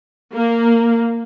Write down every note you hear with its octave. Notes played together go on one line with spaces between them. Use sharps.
A#3